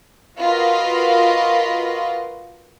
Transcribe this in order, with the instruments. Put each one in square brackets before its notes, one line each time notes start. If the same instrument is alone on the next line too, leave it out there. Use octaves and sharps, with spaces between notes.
[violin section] F4 F#4 A#4 B4 D#5 F5